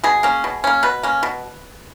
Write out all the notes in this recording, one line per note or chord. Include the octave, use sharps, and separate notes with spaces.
B2 G#4
A#3 C#4
B2
A#3 C#4
B2 B4
A#3 C#4
B2